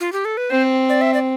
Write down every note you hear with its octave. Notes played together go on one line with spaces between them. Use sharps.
F4
G4
A4
B4
C4 C5
D5
E5
D5